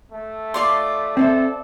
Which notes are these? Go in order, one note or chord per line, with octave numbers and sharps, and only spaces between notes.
A3
F4 D5 C6
C4 A4 C5 E5